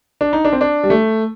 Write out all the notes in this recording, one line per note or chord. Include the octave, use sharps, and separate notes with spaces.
D4
D#4
D4
C4
D4
G3
A3